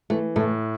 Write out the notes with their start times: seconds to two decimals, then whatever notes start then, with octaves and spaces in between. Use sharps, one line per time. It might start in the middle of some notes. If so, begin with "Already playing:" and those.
0.10 E3 A3
0.36 A2 A3